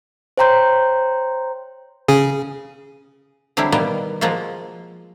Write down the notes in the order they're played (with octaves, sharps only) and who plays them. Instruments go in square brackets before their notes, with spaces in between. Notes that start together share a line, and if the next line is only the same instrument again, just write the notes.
[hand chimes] C5 C#5 G5 A#5 C6 G6
[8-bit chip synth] C#3 G#4
[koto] D3 F#3 G3 C4 E4
B2 D#3 G3 A#3 B3
F3 G#3 A#3 F4 F#4